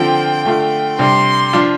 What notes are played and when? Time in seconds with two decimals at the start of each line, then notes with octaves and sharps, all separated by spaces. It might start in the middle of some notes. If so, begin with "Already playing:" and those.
Already playing: D3 F3 C4 F4 G5
0.45 D3 A3 F4
0.99 C3 G3 D4 C6
1.53 F3 D4 F4